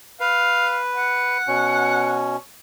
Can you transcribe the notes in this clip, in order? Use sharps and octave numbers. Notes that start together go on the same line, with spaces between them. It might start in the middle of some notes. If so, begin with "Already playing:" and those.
B4 F5
F#5
B2 C#4